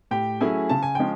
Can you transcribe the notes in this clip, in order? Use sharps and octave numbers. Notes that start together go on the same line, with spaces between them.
A2 G4 G5
F#3 A3 C#4 E4 G#4 G#5
C#3 A5
G#5
F3 G#3 C#4 G5